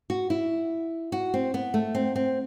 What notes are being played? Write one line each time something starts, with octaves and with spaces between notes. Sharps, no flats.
F#4
E4
F#4
C4
B3
A3
C4
C4